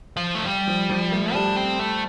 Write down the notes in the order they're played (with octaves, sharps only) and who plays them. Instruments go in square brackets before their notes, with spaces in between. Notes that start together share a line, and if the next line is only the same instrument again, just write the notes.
[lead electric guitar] F3
A3
G3
[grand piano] F3
F3
A3
[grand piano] G3 [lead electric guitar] D4
[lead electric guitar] C4
A3